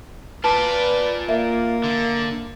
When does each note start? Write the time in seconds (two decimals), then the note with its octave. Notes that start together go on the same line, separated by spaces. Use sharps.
0.44 F4 B4 D5 A5
1.29 A#3 E5
1.84 D3